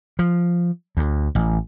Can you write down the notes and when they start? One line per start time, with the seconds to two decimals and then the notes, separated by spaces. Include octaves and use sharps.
0.19 F3
0.97 D2
1.35 A1